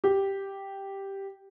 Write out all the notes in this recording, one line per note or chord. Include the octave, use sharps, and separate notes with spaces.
G4